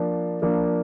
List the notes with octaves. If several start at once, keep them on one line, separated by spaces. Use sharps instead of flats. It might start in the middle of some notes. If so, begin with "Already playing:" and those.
Already playing: F3 A#3 D4
F3 A#3 D4